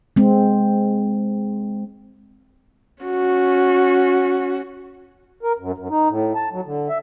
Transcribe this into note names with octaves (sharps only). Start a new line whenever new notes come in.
G#3 C4
C#4 F#4
A#4
F#2
F#2
D#4
A2
A5
F#3
D3
E5